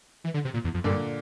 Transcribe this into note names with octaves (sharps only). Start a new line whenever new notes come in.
E3
D3
C3
A#2
E2
F2
G2 A#2 D3